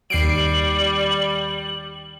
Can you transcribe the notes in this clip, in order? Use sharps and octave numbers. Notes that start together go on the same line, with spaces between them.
D#2 G3 C7 D7 F#7